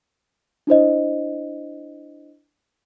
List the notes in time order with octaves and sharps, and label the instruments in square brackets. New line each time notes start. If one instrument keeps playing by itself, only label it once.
[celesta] D4 E4 C5 D#5